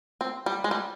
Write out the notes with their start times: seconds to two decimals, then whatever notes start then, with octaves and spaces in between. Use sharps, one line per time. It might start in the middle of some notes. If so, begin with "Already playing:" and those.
0.21 C4
0.46 G3
0.64 G#3
0.71 G3